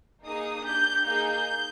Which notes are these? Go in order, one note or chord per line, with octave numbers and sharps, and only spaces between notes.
A#3 D#4 G#4 D#6
D4 G4 G6
A#3 D#4 G#4 G6